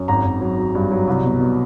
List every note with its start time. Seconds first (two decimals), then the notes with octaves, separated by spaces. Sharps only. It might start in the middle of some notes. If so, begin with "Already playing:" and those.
Already playing: F#2
0.08 G#1 A#5
0.25 G#1
0.41 F#3
0.58 F#3
0.75 G2
0.92 F#3
1.08 C2
1.24 B2
1.40 B2